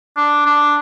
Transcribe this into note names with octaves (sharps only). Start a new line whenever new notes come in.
D4
D4